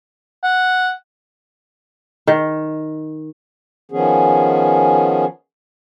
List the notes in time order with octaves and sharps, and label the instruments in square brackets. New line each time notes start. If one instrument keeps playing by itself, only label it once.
[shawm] F#5
[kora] D#3
[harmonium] D#3 F3 B3 C#4 G#4